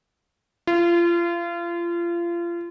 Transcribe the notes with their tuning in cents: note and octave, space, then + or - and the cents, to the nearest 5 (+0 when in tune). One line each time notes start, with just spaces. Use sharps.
F4 -30